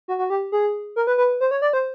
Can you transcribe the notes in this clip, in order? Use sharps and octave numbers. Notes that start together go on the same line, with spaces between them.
F#4
F#4
G4
G#4
A#4
B4
B4
C5
C#5
D5
C5